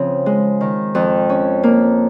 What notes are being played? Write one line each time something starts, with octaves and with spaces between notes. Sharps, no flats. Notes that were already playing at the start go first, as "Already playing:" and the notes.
Already playing: C#3 F3 C4
G#3
D#3
F2
C#4
A#3